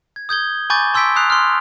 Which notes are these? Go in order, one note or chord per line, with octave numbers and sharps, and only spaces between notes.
G#6
D#6 G6 G#6 G7
G#5 B5 C#6 D6 G6 A6
A5 C6 E6 G6 B6 D7
A#5 D#6 F#6 C7 F7
C6 D#6 F6